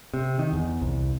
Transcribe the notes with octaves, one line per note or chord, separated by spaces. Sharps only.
C3
D#3
E2
C2